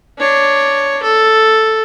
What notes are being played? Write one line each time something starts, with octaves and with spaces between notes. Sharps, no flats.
D4 C#5
A4